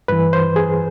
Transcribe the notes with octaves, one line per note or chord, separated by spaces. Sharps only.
G2 E3 B4
C5
G#4